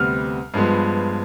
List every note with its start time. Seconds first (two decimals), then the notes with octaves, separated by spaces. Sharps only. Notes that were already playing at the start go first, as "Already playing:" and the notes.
Already playing: D2 C3 G3 B3 F6
0.54 G2 F3 G#3 B3